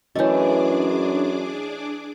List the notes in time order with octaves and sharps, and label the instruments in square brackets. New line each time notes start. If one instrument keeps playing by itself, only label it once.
[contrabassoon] F#2 [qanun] E3 A3 [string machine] D4 G#4 D6 [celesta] C#5 D#5